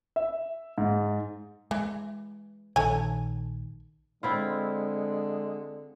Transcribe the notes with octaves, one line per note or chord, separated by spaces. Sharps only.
E5
G#2
E3 G#3
A#1 D#3 A4 C#5 G#5
D3 G#3 C4 E4 F4